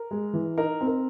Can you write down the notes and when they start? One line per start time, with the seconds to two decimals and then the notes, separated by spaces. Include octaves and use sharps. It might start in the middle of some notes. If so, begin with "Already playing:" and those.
Already playing: A#4
0.11 G#3
0.33 E3
0.58 D#4 A#4
0.81 C4
0.87 A#4